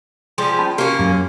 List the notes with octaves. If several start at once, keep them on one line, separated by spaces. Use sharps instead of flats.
F3 G3 G#3
C#4 A5 B5
A#3 C#4 F#4 G4
F#2 F#3